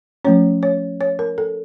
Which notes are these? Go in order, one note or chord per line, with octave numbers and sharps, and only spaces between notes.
F3 A3 C#4 C#5
C#5
C#5
A#4
A4